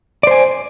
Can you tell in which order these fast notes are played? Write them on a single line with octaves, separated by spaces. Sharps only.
D5 C5 G#5